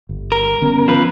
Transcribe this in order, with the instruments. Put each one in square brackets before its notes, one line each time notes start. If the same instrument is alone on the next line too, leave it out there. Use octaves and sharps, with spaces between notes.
[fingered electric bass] G1
[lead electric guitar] A#4
[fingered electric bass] D3 B3 C#4
[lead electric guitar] F3 B4